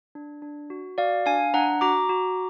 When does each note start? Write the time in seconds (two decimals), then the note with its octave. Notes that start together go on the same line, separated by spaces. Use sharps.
0.15 D4
0.42 D4
0.70 F#4
0.98 F#4 D5 F5
1.26 D4 F5 G#5
1.54 D4 F#5 A#5
1.81 F#4 A#5 D6
2.09 F#4